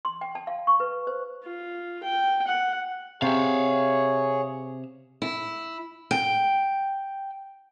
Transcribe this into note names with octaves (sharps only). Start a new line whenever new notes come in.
C6
G5
A5
F5
C#6
B4
C5
F4
G5
F#5
C3 G#4 C#5 E5 F5
E4
G5